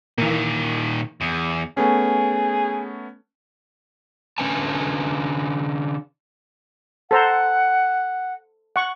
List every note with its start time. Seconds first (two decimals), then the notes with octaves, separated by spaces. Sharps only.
0.18 A#2 D#3 E3 A#3
1.21 E2
1.77 A3 B3 C#4 G#4
4.38 D3 C#4 B4 G#5 A5
7.11 A4 C5 F#5 A#5
8.76 F#5 C#6